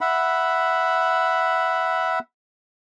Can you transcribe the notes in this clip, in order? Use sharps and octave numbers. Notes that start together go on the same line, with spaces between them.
E5 F#5 B5